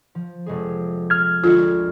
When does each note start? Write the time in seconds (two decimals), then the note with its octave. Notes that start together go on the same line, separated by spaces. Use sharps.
0.15 F3
0.46 F1 G#3 G#4
1.10 F6 G#6
1.44 D2 G#3 F4 C#7